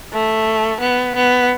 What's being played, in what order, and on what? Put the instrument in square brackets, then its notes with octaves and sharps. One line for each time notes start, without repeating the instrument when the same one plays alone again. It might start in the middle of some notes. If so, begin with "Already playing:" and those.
[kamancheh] A3
B3
B3